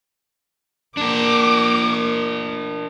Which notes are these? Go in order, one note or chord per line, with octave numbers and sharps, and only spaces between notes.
A#3 D4 A#4 D6